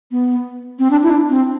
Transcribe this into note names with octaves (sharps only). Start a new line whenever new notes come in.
B3
C4
D4
E4
D4
C4